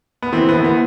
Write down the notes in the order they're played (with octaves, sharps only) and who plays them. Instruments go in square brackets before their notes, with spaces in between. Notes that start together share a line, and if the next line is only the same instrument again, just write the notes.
[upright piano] B3
[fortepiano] E3 [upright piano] C4
[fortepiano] E3 [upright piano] B3
[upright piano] B3